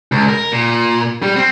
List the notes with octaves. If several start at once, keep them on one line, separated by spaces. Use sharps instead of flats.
C#2
A#4
A#2
G3
C4